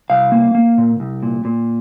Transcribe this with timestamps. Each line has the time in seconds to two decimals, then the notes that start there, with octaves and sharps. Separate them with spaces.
0.10 C2 F5
0.32 A#3
0.55 A#3
0.78 A#2
1.00 C2
1.23 A#2
1.45 A#2